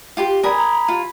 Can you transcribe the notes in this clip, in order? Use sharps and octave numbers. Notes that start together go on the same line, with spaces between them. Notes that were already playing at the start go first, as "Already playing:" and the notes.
F4 G4 C6
A#4 D5 G#5 B5 D#6
A#5
F4